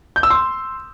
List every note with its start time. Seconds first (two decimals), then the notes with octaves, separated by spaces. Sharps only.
0.16 G6
0.23 E6
0.30 C6